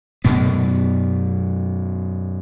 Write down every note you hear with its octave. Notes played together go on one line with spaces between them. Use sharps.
F#2 B2 B3